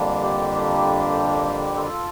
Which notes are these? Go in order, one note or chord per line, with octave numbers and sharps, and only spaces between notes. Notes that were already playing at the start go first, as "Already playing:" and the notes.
Already playing: F2 D3 G3 A#3 D4
G4
F4 A4